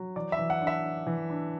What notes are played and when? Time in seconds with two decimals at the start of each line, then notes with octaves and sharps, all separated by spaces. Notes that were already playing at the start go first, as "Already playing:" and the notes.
Already playing: F#3
0.16 E3 D5
0.32 E5
0.39 E3
0.50 F#5
0.62 D4
0.67 E5
0.84 D4
1.07 E3
1.30 D4